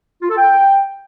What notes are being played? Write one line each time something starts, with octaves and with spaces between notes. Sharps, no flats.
F4
A4
G5